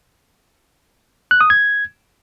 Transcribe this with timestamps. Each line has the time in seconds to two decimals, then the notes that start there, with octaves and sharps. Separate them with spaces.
1.31 F#6
1.41 D#6
1.50 G#6